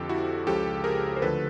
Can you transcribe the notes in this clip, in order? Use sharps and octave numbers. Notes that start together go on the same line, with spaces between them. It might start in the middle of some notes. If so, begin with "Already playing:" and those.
Already playing: F2 D3 F3 G4 A4
E4 F#4
C#2 C#3 F3 G4 A4
G#4 A#4
C5
D2 D3 F3 A4 B4